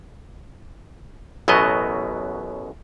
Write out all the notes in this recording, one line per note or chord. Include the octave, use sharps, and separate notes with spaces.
A1 F#2 B2 F#3 B3 D#5